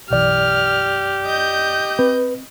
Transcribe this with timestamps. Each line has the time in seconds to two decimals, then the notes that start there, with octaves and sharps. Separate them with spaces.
0.10 B1 F#2 E3 G4 D5 F6
1.26 D#5 G6
1.99 C4 B4